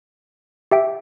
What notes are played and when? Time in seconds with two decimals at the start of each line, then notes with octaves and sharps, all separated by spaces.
0.71 G4 E5 G5